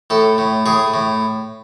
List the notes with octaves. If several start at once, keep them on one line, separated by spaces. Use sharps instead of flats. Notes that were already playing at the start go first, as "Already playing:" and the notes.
A2 A4
A2
A2 G#4
A2